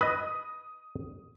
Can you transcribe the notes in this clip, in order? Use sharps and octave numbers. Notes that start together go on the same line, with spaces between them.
B4 D#5 D#6